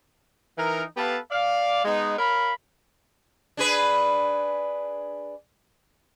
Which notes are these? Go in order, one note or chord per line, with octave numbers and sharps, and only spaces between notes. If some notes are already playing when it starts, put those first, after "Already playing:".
E3 D#4 A#4
B3 G4 A4 B4 F5 A5
D5 F5
G#3 B3 D#4
A#4 C#5 F5 B5
D4 G#4 B4